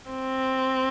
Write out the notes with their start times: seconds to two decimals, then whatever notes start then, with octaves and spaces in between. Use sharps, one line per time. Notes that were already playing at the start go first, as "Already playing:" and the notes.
0.10 C4